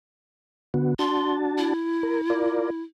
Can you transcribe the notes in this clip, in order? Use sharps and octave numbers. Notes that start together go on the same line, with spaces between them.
D3 B3 F#4
D4 F#4 A5 C6
E4
A#4
F4 A#4 D5